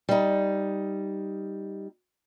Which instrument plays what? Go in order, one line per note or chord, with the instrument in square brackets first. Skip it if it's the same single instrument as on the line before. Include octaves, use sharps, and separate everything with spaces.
[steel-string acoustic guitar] G3 D#4